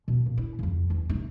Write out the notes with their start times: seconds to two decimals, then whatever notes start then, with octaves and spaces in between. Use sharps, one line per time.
0.08 B2
0.26 A#2
0.38 E4
0.59 F2 C#3
0.90 E2
1.10 C3 D#4